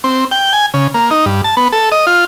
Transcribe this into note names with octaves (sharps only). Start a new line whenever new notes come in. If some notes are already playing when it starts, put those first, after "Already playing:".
C4
G5
G#5
C#3
A#3
D#4
G2
A5
B3
A4
D#5
F4